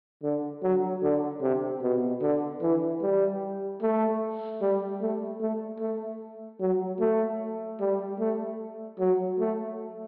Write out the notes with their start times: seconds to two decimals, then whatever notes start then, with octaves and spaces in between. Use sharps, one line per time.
0.23 D3
0.62 F#3
1.03 D3
1.41 C3
1.82 B2
2.21 D3
2.61 E3
3.01 G3
3.82 A3
4.61 G3
5.01 A3
5.41 A3
5.80 A3
6.60 F#3
7.00 A3
7.80 G3
8.19 A3
8.99 F#3
9.39 A3